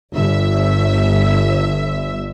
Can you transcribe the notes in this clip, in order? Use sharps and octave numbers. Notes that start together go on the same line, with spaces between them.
G1 E5